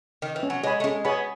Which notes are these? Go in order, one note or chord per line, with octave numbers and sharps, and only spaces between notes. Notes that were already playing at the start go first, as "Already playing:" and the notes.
D#3
E3
C#4
F#3
G#3 G#4 C#5 G#5 B5
A3
G#3 C#4
B3 G#4 C#5 G#5 B5